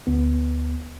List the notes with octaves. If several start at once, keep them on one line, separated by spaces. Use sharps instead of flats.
D2 B3